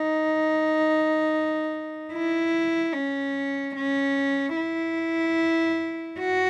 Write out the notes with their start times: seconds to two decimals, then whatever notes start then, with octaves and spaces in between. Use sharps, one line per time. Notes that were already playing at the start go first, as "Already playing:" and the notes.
Already playing: D#4
2.13 E4
2.93 C#4
3.76 C#4
4.56 E4
6.19 F#4